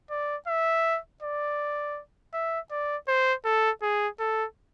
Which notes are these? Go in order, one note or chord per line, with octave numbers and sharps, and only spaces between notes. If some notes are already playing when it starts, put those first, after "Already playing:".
D5
E5
D5
E5
D5
C5
A4
G#4
A4